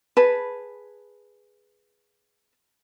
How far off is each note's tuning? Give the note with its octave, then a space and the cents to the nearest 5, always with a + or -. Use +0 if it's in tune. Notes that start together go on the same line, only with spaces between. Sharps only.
G#4 -5 B4 +0 A5 +0